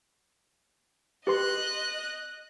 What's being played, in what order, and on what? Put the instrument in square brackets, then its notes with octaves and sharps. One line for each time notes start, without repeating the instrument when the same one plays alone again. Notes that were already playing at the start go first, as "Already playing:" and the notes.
[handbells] G4 B4 C6 [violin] D#5 F#6